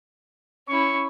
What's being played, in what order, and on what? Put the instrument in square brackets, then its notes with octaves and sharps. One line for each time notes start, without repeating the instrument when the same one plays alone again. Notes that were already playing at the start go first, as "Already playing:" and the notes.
[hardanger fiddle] C#4 E4 [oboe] C#6